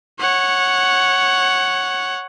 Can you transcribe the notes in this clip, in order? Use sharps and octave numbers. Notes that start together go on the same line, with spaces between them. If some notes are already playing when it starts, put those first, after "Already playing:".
C#5 F#5